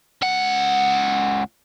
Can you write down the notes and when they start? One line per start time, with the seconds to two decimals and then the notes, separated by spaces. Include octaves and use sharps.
0.22 C#2 F#5